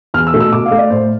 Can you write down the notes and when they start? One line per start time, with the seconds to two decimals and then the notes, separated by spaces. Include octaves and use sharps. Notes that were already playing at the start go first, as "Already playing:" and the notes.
0.14 E2 F6
0.27 E6
0.34 B2 A3
0.40 E6
0.53 B2 D6
0.66 F5
0.71 A3
0.79 D5
0.90 A2 C5